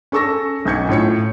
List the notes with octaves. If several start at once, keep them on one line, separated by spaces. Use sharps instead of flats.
C#4 A4 C#6 E6 A#6
B1 C#4 G#6 C#7
A2 F4 C#5 C#7